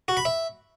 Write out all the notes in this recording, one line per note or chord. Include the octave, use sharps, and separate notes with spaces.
F#4
B5
E5